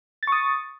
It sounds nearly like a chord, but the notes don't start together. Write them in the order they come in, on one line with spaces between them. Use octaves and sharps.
A6 C#6 D#6